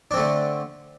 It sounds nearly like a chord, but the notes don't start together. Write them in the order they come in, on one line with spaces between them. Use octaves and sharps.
D4 C4 A3 D3